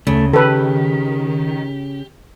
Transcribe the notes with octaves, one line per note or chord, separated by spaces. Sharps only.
D2 C#3 A3
D#3 G4 A4 B4